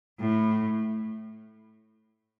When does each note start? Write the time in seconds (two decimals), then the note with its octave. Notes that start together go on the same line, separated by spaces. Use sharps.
0.19 A2